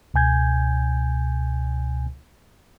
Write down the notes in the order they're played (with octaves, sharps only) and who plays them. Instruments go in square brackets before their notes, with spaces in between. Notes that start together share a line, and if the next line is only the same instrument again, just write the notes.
[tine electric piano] C#2 B2 G#5 G6 G#6